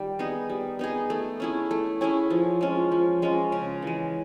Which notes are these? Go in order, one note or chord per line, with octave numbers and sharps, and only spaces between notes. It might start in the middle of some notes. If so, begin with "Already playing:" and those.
Already playing: D#3 G3
B3 D#4 G#4
G3
B3 D#4 G#4
A3
C#4 E4 G#4
A3
C#4 E4 G#4
F3
G#3 C#4 F4
F3
G#3 C#4 F4
C#3
E3 G#3